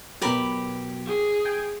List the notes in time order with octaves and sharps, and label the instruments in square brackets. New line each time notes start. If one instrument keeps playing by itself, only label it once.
[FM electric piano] B2 F#3 [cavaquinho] G4 A#4 B5
[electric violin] G#4
[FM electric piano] G5 G#5